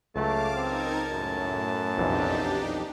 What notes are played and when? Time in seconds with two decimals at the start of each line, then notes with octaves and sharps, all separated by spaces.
0.16 C#2 F#3 A3 F5 A5 D6
0.55 C4 D#4 A#4 G#6
1.12 F#2 A2
1.98 B1 F2 E3 D4 D#4 G4